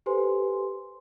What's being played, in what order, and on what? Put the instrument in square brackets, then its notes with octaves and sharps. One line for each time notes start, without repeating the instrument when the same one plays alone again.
[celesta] G4 A4 B4 C5 G#5 C6